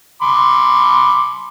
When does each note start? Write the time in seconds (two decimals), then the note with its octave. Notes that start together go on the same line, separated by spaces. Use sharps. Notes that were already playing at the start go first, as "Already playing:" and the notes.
0.22 B5 C6 D6